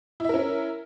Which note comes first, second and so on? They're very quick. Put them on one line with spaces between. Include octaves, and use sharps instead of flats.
E4 E5 A#4 C#4